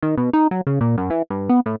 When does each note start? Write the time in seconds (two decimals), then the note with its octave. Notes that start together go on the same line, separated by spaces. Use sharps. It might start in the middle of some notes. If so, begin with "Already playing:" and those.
0.03 D#3
0.17 B2
0.33 D#4
0.51 F#3
0.67 C#3
0.81 A#2
0.97 F#2
1.10 E3
1.30 G2
1.49 B3
1.66 A2